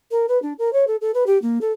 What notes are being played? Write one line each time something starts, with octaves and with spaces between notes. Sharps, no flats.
A#4
B4
D4
A#4
C#5
A4
A4
B4
G4
A#3
A4